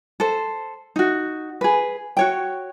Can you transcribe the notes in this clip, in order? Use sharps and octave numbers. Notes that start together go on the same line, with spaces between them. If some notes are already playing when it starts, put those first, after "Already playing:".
A4 C5
D#4 F#4
G#4 B4
F#4 C#5 G5